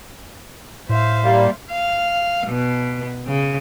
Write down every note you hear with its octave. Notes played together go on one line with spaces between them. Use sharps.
A2 C5 E5 F5
G3 A#3
F5
B2
C#3